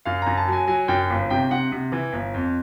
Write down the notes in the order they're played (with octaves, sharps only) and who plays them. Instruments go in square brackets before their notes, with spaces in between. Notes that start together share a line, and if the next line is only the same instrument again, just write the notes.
[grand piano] F#2 F5
F#2 A#5
A5
F#3 G#5
F#3 G#5
F#2 G5
G1
C3 G5
C3 F#5
C3
E3
G1
F2